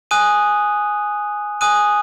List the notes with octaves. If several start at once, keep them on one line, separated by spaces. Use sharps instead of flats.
G#5 D#6 F#6 D#7
G#5 D#6 F#6 D#7